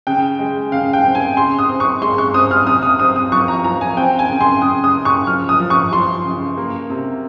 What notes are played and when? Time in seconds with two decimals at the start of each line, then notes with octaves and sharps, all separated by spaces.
0.07 C#3 G5
0.39 G#3
0.72 C#3 F5
0.93 G5
1.04 C4
1.15 G#5
1.37 C#3 C6
1.59 D#6
1.69 C4
1.80 C#6
2.02 G#3 C6
2.18 C#6
2.34 C4 D#6
2.51 F6
2.67 C3 D#6
2.83 D#6
2.99 C4 D#6
3.16 D#6
3.32 F3 C#6
3.48 A#5
3.64 F3 A#5
3.81 G#5
3.97 C4 G5
4.19 G#5
4.29 C#3
4.41 C6
4.62 C#3 D#6
4.84 D#6
4.95 C#3
5.05 C#6
5.27 F3 F6
5.49 D#6
5.60 F3
5.70 C#6
5.92 F3 C6
6.25 C#3
6.57 A#3
6.90 C3